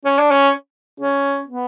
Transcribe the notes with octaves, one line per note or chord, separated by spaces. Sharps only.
C#4
D4
C#4
C#4
B3